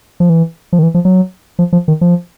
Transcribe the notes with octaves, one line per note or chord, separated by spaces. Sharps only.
F3
E3
F3
D#3
E3
F3
F#3
F3
F3
D#3
F3